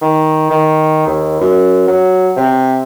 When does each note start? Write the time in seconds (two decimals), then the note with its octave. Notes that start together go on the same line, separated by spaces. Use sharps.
0.02 D#3
0.50 D#3
1.07 D#2
1.41 F#2
1.88 F#3
2.37 C3